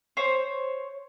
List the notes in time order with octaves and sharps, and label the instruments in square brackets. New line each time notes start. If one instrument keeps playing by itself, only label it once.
[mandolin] C5 C#5